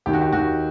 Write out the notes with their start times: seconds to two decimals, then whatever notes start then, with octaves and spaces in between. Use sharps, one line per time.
0.06 D#2 G4
0.13 F#4
0.21 G4
0.33 D#2 F#4